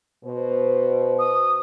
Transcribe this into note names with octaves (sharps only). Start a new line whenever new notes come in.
B2 C5
D#6